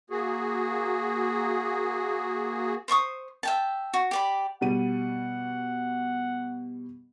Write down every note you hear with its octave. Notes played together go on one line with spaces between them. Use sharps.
A#3 F#4 G#4
C5 D5 C#6 D#6
E5 G5 A5
F#4
G4 D5 B5
B2 G3 F#5 D#7